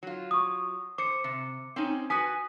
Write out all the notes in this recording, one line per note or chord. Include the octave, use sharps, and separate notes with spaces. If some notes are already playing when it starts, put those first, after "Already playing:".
F#3 F4
C#6 D#6
C5 D6 C#7
C3
C4 C#4 D#4
F#4 B4 G#5 D#6 B6